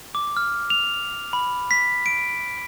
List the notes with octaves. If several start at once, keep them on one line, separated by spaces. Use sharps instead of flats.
D6
F6
F7
B5
B6
D7